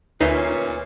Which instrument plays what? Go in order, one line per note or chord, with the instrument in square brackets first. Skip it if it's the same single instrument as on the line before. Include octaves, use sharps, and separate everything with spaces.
[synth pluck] D2 D#4 C7 [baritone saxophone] A#2 [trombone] C#4 [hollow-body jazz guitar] B4 E5